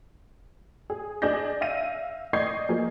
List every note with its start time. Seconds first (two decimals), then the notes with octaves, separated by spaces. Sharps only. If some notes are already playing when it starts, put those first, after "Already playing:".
0.90 G#4
1.22 D4 G#4 D5 D#5 G6 A#6
1.61 E5 F5 A#6 D#7
2.33 D5 D#5 C#6 G6 G#6 C7
2.69 F3 A#3 G#4